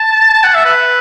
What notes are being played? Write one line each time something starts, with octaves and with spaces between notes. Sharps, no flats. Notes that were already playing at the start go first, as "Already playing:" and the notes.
Already playing: A5
A5
F#5
E5
B4